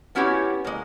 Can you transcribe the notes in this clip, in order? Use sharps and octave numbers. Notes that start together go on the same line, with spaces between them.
B3 C#4 E4 F#4 G4 C#5
G#3 A#3